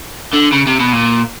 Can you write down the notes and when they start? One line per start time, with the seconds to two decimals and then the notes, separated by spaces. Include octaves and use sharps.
0.33 D3
0.52 C#3
0.67 C3
0.80 B2
0.93 A#2